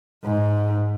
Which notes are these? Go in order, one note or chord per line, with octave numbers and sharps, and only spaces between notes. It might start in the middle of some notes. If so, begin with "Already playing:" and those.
G#2